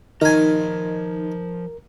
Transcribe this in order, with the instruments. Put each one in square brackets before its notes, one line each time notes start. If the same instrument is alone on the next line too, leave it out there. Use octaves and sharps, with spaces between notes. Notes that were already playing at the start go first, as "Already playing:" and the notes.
[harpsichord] D#3 G#5 [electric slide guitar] F3 A#5 [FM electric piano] D#4 [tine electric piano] A#4